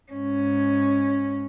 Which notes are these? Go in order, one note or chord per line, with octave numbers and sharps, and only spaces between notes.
G#2 C#4